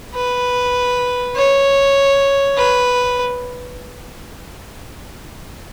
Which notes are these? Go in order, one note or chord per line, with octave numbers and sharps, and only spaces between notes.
B4
C#5
B4